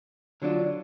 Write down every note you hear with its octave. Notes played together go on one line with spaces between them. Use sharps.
D3 F#3 D4 F4